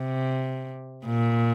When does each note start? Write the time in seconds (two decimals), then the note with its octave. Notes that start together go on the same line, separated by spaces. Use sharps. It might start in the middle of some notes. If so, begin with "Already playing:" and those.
Already playing: C3
1.06 A#2